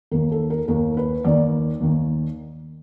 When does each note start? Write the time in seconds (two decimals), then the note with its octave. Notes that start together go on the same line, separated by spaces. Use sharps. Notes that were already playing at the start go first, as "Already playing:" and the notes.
0.11 D#2 D#3 A#4
0.31 A4
0.50 A#4
0.68 D#2 D#3 A#4
0.97 B4
1.24 D#2 D#3 D5
1.80 D#2 D#3